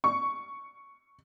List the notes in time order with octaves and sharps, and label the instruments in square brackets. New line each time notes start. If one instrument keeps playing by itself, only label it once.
[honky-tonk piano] C#6